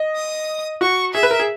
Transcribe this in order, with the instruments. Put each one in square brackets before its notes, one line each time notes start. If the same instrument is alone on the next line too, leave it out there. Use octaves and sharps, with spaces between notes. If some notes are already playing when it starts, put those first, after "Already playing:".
Already playing: [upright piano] D#5
[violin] D#6
[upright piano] F#4 [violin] C#6
[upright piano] G#4 [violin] E5
[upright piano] B4
A#4
G#4